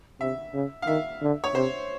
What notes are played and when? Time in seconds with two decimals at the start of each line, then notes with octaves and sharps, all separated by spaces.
0.21 C3 E5
0.54 C#3
0.82 F5
0.87 D#3 E5
1.22 D3
1.44 C#5
1.55 C3 C5